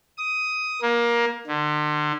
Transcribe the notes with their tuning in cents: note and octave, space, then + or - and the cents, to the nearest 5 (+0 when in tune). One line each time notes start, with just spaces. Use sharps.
D#6 +10
A#3 +20
D3 +35